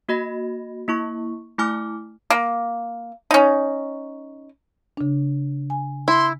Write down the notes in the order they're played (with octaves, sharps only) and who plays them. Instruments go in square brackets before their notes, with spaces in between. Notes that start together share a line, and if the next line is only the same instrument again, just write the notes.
[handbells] A#3 F#4 D#5 B5 A#6
A#3 E4 C#6
A3 E4 G#5 D6 F6
[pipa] A#3
C#4 D#4
[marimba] C#3 D4
G#5
[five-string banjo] E4 [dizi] C6